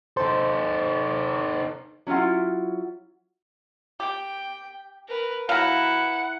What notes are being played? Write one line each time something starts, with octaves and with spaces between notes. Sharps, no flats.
D#4 A4 C5
F#3 C#4 E4 F4 F#5
G4 G5
A#4 B4
F#3 E4 B4 F5 F#5 A#5